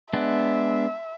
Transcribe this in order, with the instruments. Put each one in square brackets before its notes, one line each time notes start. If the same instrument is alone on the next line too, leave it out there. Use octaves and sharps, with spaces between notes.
[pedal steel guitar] G#3 B3 D4 [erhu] E5